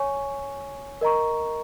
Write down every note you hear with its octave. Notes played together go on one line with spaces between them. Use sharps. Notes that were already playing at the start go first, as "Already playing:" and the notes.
Already playing: C#5 G#5 C#6
A#4 D#5 A#5 C#6